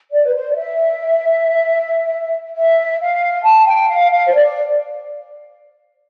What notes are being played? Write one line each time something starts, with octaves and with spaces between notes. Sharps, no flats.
D5
B4
C5
D5
E5
E5
F5
A5
G5
F5
F5
C5
D5